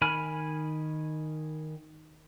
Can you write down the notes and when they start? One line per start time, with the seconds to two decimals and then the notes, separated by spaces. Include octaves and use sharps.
0.02 D#3 G#5 B5 F6